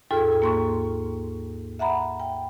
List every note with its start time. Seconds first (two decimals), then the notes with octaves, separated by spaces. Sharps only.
0.11 D#2 G#2 F4 A4 G5 F6
0.42 A#3 C6 C#6
1.79 E5 F#5 A#5 B5
2.20 G5